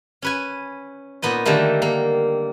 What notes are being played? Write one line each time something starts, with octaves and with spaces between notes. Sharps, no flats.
C#4 B4 G#5
A#2 B3 D#4 D#5
D3 D#3 G3 A3 A#3
A#3